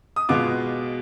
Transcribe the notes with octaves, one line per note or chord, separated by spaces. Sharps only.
D#6
B2 G#3 B3 F4 D6